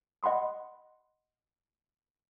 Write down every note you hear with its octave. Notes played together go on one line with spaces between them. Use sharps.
D#5 F#5 B5 C6 D#6